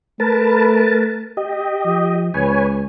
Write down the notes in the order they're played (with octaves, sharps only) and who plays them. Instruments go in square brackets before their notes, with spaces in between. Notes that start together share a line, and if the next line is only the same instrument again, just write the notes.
[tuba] A3 [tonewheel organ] A#4 B4 A5
[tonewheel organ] G4 D#5
[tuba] F3
[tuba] C#2 [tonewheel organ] B4 C#5 G#5